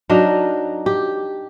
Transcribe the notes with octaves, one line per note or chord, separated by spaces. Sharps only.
F#3 D4 D#4 A#4
G4